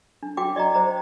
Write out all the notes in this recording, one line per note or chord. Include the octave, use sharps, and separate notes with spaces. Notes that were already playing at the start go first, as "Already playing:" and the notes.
D4
D4 F#4 G5 D6
D5 D#5 G5 A#5
C5 A#5